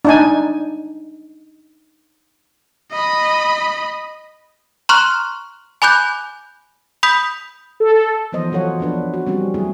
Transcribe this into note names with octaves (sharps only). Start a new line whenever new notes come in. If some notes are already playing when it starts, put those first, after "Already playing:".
D4 D#4 G#5
D#5 B5
A#5 C6 C#6 F6 F#6
G#5 B5 D6 F#6 G6
B5 D#6 G6 B6
A4
E3 F3 B3 C5 D#5
F#3 F4 A4 C#5 F#5
F3 B3 D4 B4
F#4
G3 C4 C#4 F#4
F3 F#3 A3 E4 G#4